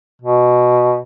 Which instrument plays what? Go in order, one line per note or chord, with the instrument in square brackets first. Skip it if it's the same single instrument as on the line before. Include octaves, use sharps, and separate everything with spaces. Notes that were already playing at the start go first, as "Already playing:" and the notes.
[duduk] B2